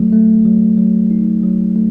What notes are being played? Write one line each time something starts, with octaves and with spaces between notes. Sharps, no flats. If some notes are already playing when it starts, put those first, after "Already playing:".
Already playing: F#3 A3
A3
F#3
F#3
D#4
F#3
A3